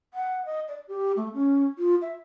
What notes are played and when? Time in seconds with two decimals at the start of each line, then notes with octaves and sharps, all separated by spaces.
0.14 F#5
0.45 D#5
0.68 D5
0.88 G4
1.17 A3
1.34 C#4
1.78 F4
2.02 E5